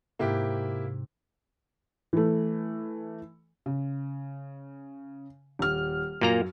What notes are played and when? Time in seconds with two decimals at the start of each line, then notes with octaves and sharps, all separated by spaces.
0.19 G#2 C3 A#3 E4 G4
2.13 E3 A3
3.66 C#3
5.59 D#1 F6
6.21 F#2 A#2 A#3 A#5